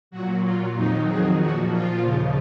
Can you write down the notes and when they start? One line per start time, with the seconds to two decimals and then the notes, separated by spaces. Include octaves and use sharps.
0.11 A#2 F#3 F#4
0.43 F4
0.74 F2 D#3 F#3 D#4
1.06 G#4
1.39 A#2 F3 F#4
1.71 F4
2.03 D#2 C#3 F3